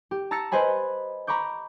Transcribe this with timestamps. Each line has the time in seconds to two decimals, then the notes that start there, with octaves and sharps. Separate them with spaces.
0.11 G4
0.31 A5 A#5 E6 A6 A#6 C#7
0.52 B4 C5 D#5 G#5 B5
1.27 A#5 B5 C#6 D6 G6